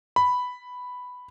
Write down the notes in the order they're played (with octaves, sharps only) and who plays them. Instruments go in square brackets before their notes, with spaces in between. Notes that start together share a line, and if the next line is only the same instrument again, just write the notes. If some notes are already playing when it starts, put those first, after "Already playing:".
[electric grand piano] B5